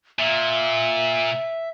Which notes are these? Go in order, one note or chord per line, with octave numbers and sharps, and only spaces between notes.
A#2 E5